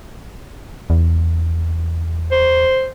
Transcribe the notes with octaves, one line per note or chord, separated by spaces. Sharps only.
E2
C5